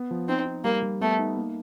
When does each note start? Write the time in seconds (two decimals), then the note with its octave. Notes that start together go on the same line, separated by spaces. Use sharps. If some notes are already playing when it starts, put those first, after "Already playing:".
Already playing: B3
0.11 F3
0.28 C4 D#4
0.46 D#4
0.64 G3 A#3
0.83 G3
1.01 A3 B3
1.19 D#4
1.37 A#3